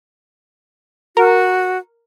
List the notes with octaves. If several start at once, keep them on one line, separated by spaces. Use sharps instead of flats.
F#4 A#4